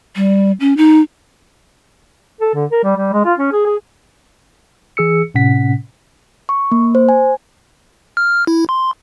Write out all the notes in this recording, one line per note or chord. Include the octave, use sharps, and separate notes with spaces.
G3
C#4
D#4
A4
D3
A#4
G3
G3
G#3
F4
C#4
G#4
G#4
E3 G#4 E6 C#7
A2 C3 C#4 F#5 B6
C#6
A#3
C5
G#5
F6
E4
C6